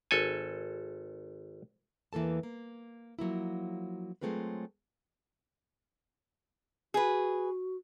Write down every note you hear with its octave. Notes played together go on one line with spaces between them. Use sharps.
G#1 A4 G#5
E2 E3 A#3 A4 A5
A#3
F3 F#3 A#3 E4
F#3 G#3 A3 C4 F4 B4
F#4 G#4 B4